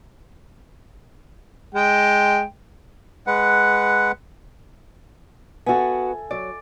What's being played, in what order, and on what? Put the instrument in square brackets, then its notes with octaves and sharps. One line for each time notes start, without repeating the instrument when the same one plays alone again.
[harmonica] G#3 G5
[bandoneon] G#3 B4 F#5
[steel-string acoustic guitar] B3 F#4 [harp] A4 E5 G#5
[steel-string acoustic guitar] F#3 [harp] D5